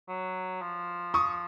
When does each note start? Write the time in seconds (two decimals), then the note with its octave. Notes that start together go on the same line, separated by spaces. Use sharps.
0.09 F#3
0.62 F3
1.14 C#6 D#6